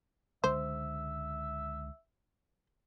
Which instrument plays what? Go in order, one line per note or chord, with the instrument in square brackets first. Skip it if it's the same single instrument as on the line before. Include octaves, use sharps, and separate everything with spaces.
[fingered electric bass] C#2 D3 G#3 [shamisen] C5 [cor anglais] E5